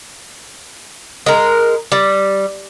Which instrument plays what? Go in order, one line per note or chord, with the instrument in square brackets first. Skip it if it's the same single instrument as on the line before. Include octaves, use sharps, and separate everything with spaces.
[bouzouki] G#3 A#4
G3